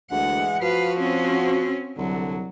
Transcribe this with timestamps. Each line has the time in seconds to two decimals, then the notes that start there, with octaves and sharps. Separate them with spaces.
0.11 D2 E3 G#3 F#5
0.62 F3 F#4 B4 F5
0.99 C4 C#4
1.97 C2 D3 F#3